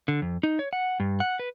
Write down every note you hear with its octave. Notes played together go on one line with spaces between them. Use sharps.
D3
F2
D#4
C#5
F#5
G2
F#5
B4